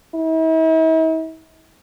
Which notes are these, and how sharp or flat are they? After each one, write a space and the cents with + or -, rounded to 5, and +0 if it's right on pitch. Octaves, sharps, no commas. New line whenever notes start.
E4 -45